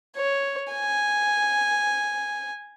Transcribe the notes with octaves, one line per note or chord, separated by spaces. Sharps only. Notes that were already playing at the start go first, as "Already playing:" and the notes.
C#5
G#5